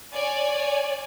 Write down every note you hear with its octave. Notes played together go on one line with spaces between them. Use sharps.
C#5 D5 G#5